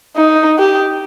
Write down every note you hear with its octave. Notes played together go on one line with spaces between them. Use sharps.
D#4
G4